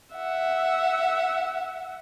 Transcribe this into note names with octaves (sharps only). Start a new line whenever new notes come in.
E5 F#5